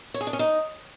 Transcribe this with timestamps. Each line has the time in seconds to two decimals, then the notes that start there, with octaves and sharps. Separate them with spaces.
0.14 C#5
0.21 G#4
0.27 D4
0.33 C#4
0.39 D#4